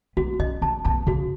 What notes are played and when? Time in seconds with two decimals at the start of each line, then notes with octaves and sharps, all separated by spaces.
0.17 B3 F#4
0.39 C#4 D#5
0.62 B3 A5
0.85 B3 A5
1.07 C#3 F#4